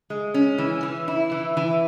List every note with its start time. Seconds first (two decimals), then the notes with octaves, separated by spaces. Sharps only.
0.10 G#3
0.34 C#4
0.58 E3
0.83 E3
1.08 E4
1.32 E3
1.57 E3